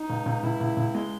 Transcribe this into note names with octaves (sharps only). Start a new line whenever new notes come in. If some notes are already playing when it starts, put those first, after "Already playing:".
Already playing: D#4
C#2
C#2
C#2 E4
C#2
C#2
G#3